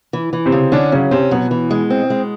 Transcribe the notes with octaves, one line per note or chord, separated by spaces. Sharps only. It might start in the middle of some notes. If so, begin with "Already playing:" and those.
E3
E3
C3 C4
C#3
D3 C#4 D4
C#3 F#3 C#4
C3 C4 C#4
B2 F#3 B3
E3
G#3
C4
G#3